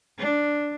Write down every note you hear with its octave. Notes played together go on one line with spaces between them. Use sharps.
D4